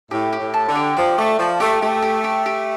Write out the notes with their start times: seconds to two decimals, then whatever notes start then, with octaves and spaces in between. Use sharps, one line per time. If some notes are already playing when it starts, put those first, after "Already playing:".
0.11 A2 G4
0.33 G4
0.40 A2
0.54 A5
0.68 D3
0.76 G4
0.97 F3 D5
1.18 A3 D5
1.39 F3 A5
1.60 A3 G4
1.81 A3 G4
2.02 G4
2.24 G4
2.46 G4